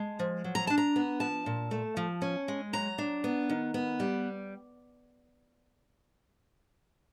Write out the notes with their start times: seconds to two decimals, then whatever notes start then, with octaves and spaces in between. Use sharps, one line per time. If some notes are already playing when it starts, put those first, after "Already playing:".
Already playing: G#3 A5
0.19 F3
0.44 F#3
0.55 A#5
0.67 D4 A5
0.78 A#5
0.96 B3
1.20 F3 A5
1.46 A#2
1.71 A3
1.97 F3
2.22 C#4
2.48 G#3
2.73 F#3 A#5
2.98 D4
3.24 B3
3.50 D#3
3.74 B3
4.00 G3